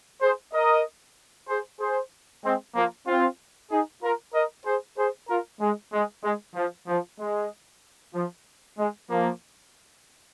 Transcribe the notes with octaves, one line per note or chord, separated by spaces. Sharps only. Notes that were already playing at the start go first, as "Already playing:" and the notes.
G#4 C5
A#4 D#5
G#4 C5
G#4 C5
G#3 C4
F3 A#3
C4 F4
D#4 G#4
F4 A#4
A#4 D#5
G#4 C5
G#4 C5
F4 A#4
G#3
G#3
G#3
F3
F3
G#3
F3
G#3
F3 A#3